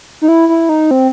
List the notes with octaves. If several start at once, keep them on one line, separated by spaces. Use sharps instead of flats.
D#4
E4
E4
D#4
C4